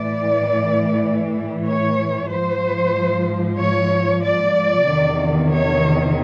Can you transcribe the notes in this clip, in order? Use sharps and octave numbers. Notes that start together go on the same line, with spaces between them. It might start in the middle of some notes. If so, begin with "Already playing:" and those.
Already playing: A2 E3 D5
C#5
G#2 F3 C5
C#5
D5
E2 C3 D#3
C#5